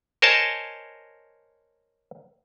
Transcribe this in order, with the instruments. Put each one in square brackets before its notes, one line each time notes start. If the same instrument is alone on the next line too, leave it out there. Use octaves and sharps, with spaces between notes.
[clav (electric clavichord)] A#4 C5 C#5 D#5 G#5 A5